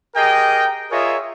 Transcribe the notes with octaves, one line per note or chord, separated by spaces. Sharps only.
G4 G#4 A#4 D#5 G5
F4 G#4 A#4 C#5 D#5 E5